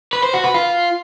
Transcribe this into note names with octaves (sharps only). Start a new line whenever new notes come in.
B4
C5
F#4
B4
F4